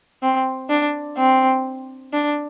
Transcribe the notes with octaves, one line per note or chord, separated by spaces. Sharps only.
C4
D4
C4
D4